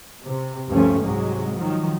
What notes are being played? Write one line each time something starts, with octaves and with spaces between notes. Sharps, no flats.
C3
D2 G2 F3 A3 C#4
C2 G#2 C3 F#3 G#3
D#3 F3 F#3